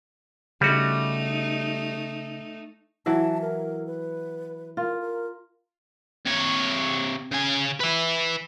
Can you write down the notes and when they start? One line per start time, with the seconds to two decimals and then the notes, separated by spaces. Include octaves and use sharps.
0.61 C#3 G3 A3 D#4 F#4
3.06 E3 F#3 E5 A5
3.41 A#4
3.87 B4
4.77 F4 A#4
5.01 A#4
6.26 C3 C#5
7.32 C#3 G#5
7.80 B4 E5